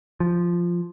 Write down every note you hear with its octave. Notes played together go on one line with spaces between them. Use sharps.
F3